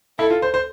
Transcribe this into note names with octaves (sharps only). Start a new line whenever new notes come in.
E4 A4
F4
C5
C5